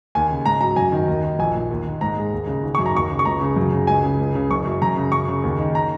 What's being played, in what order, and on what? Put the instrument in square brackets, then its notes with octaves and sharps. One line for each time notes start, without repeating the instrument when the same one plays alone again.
[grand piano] D#2 G#5
C#3
G#2 A#5
F#3 A#5
F#2 G#5
D#3
D#2
D#3
A#1 G#5
A#2
D#2
D#3
G#2 A#5
G#3
D#2
C#3
G#1
F#2 C#6
A#5
D#2 C#6
C#3
C#6
C#2 A#5
C#3
F#2
C#3
C#2 G#5
C#3
C#2
C#3
F#1 C#6
F#2
F#2 A#5
C#3
F#2 C#6
C#3
D#2
D#3
A#5